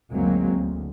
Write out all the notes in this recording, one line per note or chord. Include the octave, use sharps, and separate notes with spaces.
F#1 D2 F#3 G#3 A#3 C4
D2